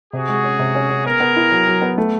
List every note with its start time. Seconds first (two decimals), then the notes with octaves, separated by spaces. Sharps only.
0.13 C3 F#4 G#4
0.29 G#3
0.44 C#4
0.59 C3
0.75 C#4
0.89 C#4
1.05 B3 G#4 A#4
1.20 B3
1.36 E4
1.51 F#3
1.67 F#3
1.82 B3
1.98 A3